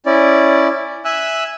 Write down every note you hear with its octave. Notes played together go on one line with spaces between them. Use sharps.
C#4 E4 D5
E5 G#5 E6 F#6